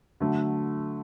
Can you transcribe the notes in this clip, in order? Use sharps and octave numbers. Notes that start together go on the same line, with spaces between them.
D3 F#3 A3